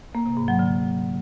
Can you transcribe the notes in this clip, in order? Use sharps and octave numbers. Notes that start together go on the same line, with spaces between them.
A#3
C3
G#2
F#3
D3